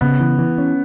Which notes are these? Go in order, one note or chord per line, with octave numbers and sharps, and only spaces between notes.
C#3 B3
E3
E3
C#4